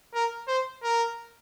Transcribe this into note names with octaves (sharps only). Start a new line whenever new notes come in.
A#4
C5
A#4